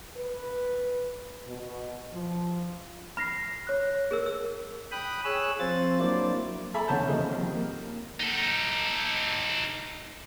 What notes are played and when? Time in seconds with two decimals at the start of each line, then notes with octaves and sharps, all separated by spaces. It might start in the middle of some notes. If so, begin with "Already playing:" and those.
0.17 B4
1.47 B2
2.12 F3
3.17 B5 F6 A#6 C7
3.67 C#5 F#6
4.11 G#4 A#4 E6
4.26 E6
4.92 G5 B5 D#6 F#6
5.24 G#4 C#5 E6 F#6
5.59 F3 C4 F4 C5 A6
6.00 F#3 A#3 D4 E4 C5 D5
6.74 A4 E5 G#5 A#5 B5
6.88 E2 D3 B3 C#4 A5 G6
7.07 C#3 F3 G3 A#3 C4 D#4
7.29 F2 D#3
7.54 A#3
8.20 D#4 A4